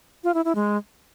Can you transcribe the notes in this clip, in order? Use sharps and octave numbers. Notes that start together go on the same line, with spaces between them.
F4
E4
E4
G#3